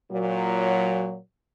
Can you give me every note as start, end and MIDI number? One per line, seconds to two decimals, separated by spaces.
0.11 1.17 46
0.11 1.17 54